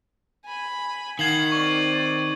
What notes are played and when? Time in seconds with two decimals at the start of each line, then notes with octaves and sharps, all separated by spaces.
0.45 G#5 B5
1.19 D#3 F5 F#5 G#6 C7 F#7
1.52 C4 D5 C#6